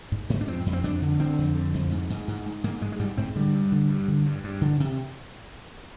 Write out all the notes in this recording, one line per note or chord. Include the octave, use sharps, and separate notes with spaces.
G#2
G#2
D4
F2 C4
F2
C4
F2 D4
D3
D3 C4
F2
D3
F2
G#2
G#2
G#2
G#2
G#2 A#3
G#2 G#3
G#3
G#2 G3
G#2 C4
D3 G3
G2
D3
G2
D3
G2
G2
D3
C3